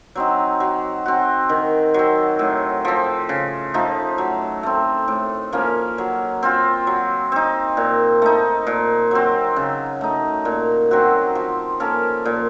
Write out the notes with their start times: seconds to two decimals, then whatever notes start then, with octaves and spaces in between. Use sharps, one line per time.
0.15 F#3 C4 D#4
0.60 F#3
1.06 C4 F#4
1.49 D#3
1.94 F#3 C4
2.39 A2
2.85 F3 C4
3.29 C#3
3.74 F3 A3 D#4
4.18 F#3
4.63 A3 C4
5.08 A2
5.53 F3 A#3 C#4
5.98 F#3
6.43 C4 F4
6.87 F#3
7.32 C4 D#4
7.77 A#2
8.22 A3 D#4
8.67 A#2
9.11 F#3 C4
9.56 C#3
10.01 A3 D#4
10.45 A#2
10.91 F#3 C4 F#4
11.35 F3
11.80 A#3 C#4 A4
12.25 A#2